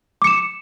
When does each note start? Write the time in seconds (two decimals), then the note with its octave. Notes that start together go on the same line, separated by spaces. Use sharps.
0.22 D6
0.24 C#7
0.27 E7